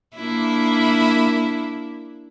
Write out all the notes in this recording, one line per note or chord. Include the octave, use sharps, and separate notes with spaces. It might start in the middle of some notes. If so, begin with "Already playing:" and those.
A#3 D4 E4